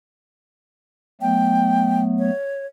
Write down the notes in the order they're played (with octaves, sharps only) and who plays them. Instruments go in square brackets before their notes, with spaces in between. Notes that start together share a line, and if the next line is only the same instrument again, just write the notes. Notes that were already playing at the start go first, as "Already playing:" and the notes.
[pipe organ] F#3 A3 B3 [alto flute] G5
[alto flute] C#5